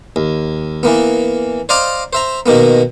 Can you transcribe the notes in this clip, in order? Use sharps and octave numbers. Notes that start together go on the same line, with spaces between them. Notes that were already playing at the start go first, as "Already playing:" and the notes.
D#2
E3 A#3 B3
C5 D5 D#5 F5 A#5 D6
C5 E5 A#5
B2 D#3 A#3 B3